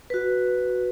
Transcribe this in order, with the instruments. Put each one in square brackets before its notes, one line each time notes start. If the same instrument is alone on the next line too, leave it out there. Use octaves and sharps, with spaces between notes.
[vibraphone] F#4 B4